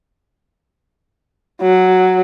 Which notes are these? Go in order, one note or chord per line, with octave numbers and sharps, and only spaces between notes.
F#3